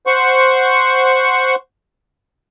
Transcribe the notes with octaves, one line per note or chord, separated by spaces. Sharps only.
C5 F#5 C#6